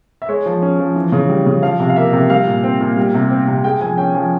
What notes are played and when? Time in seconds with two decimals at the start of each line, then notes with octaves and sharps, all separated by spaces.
0.22 E5
0.29 G#3 C#5
0.46 F3
0.62 C#4
0.79 F3
0.96 E3
1.12 C#3
1.29 G3
1.46 C#3
1.63 F3 F5
1.80 C3
1.89 F5
1.96 A#3 E5
2.13 C3
2.30 G3 F5
2.47 A#2
2.64 C4
2.80 A#2
2.97 G3
3.14 C3
3.31 C4
3.47 C3
3.64 G#3 G5
3.81 F3 G#5
3.98 C#4 G5
4.14 F3 G#5